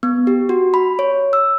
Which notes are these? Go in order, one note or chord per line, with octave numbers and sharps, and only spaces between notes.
B3
G4
F#4
B5
C#5
E6